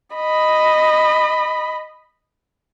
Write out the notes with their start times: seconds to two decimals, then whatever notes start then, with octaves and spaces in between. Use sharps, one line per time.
0.16 D#5 B5